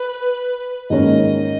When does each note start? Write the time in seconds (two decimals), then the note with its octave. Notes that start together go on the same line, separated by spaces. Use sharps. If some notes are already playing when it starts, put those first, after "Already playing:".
Already playing: B4
0.89 G#2 D#3 A#3 C#4 D#5